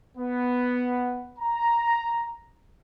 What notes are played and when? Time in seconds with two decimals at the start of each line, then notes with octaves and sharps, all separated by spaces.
0.18 B3
1.39 A#5